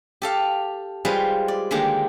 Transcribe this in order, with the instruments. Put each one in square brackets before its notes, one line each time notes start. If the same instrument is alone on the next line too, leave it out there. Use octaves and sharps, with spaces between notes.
[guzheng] G4 A4 F5
G3 G#3 F4 G#4 B4 C5
D5
D3 D#3 G#3 A#3 G4